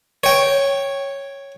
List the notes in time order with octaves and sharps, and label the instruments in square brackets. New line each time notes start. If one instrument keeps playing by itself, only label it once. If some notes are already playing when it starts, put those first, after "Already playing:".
[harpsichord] C#5 G5